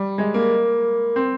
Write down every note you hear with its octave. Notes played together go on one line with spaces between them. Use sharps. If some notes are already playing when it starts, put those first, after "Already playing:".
Already playing: G3
G#3
A#3
C4